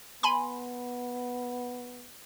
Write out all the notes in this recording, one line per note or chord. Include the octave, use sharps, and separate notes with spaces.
B3 G#5 B5 C6